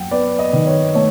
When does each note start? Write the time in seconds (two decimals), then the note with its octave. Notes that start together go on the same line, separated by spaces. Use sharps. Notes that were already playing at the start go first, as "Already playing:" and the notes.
Already playing: F#2 F#5 G5
0.11 B3 D5
0.39 D#5
0.53 D#3
0.67 C#5
0.95 A3 C#5